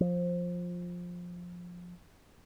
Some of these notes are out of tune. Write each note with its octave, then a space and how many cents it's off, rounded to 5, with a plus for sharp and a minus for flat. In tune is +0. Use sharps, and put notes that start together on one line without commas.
F3 +15